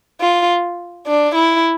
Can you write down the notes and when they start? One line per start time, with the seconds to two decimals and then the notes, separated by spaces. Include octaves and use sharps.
0.21 F4
1.07 D4
1.35 E4